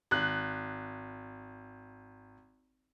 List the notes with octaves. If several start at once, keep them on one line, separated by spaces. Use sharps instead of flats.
G#1 F#6